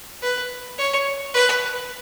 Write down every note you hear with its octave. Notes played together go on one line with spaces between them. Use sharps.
B4
C#5
B4